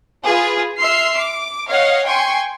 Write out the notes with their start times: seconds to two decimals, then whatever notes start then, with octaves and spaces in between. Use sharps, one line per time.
0.25 F4 G#4 B4
0.77 E5 C6 F6 C7
1.17 D6
1.68 C#5 D#5 F5 F#5
2.06 G5 G#5 C6 C#6